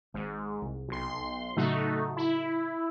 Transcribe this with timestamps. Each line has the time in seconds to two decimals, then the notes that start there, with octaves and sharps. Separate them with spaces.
0.14 G#1 G#2
0.62 C2
0.88 B1 C6
1.57 A2 C#3 F#3 A3 D#4 F#4
2.17 E4